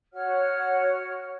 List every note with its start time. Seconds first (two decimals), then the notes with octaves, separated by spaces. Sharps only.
0.13 F#4 C#5 F#5 F6